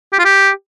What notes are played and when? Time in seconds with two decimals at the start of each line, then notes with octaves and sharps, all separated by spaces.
0.13 G4
0.19 F4
0.25 G4